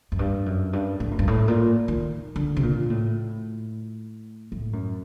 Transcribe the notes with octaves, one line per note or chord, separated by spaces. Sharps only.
F#2
G2
F#2
G2
A2
F#2
G2
A2
A#2
D#3
D3
C3
A#2
A2
A2
F#2